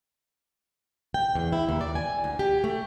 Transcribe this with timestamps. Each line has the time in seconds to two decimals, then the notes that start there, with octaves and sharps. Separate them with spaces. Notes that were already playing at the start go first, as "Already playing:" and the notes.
1.14 G5
1.35 E2
1.53 E4
1.69 D#2
1.81 D5
1.95 G#5
2.24 D2
2.39 G4
2.64 A3